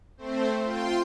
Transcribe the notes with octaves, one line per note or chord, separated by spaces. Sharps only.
A3 C4 C5
F4 G5 C6